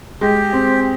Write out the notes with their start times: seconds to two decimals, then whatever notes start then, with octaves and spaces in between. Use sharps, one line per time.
0.21 G#3 G4
0.53 C4